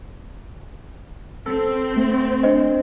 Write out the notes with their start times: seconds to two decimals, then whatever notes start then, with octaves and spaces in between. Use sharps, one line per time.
1.46 C4 A4
1.97 A3
2.43 D4 C5 D#5